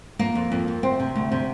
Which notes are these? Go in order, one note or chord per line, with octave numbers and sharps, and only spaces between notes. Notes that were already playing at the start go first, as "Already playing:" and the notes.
F2 A#3
F2
F2
F2
D2 C4
C3
D2
C3